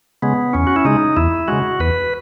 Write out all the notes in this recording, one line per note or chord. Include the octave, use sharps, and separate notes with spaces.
C#3 G#3 B3
E2 C#4
F#4
E4
C#3 G#3 D#4
E2 E4
C#3 G#3 F#4
E2 B4